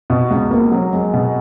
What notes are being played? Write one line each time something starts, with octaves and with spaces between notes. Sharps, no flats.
B2
C#2
A#3
F#3
G#3
B2